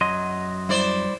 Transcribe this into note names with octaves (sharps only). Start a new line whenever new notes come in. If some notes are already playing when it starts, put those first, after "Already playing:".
F#2 F#3 D#5 C6
G3 E4 C5 D5